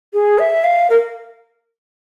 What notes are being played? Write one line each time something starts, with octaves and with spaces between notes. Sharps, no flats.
G#4
E5
F5
A#4